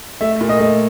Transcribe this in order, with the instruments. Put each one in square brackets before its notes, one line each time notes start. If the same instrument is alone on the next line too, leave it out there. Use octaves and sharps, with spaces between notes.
[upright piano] A3 [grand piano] E5
[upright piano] A#2
[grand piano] D#5
[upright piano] A3